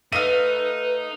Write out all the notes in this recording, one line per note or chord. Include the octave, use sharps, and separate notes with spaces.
A3 D#4 B4 D#5 F5 D#7